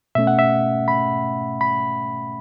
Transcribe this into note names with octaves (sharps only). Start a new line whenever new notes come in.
B2 A3 C#4 E5
F#5
E5
B5
B5